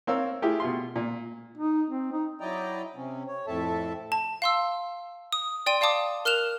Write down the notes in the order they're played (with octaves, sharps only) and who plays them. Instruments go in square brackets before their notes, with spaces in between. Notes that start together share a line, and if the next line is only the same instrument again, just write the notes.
[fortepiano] C4 A#4 C#5 F5 E6
A3 E4 F4 G4 G#4
B2 F4 C6
A#2
[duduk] D#4
C4
D#4
[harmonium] F#3 E4 D5 D#5 G5 A#5
C3 C4 C#4
C#5
F2 A2 C4 A4 E5 A5
[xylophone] A5
F5 C6 E6
D#6
D5 G5 C6 D#7
D5 F5 A5 D6 D#6
A#4 F6 F#6 E7 F7